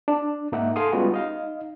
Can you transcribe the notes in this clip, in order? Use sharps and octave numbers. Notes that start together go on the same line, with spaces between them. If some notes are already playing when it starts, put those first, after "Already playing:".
D4
G#2 A#3 D#4 E5 F#5
G#4 A4 F5 C6 D#6
G3 G#3 B3 C#4 F4 F#4
D#4 D#5 F5